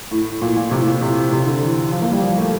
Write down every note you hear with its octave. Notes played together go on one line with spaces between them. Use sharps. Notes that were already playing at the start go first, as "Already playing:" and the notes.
A2
A#2
A#2
C3
A2
A#2
C3
C3
D3
E3
F3
A#3
G3
F3
A3